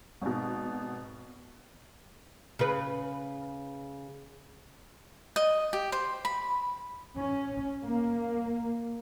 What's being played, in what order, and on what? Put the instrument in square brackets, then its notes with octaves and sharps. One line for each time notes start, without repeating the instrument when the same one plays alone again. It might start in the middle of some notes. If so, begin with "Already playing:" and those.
[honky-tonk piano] G#1 B2
[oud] C#3 B4
[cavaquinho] D#5
G4
C5
B5
[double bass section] C#4
A#3